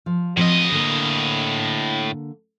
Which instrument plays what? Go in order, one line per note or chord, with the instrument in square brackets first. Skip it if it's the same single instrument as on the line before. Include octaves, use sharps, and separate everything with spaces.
[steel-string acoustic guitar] F3
[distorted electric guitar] A2 D#5 [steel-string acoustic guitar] F3 C4
[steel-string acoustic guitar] D3 A#3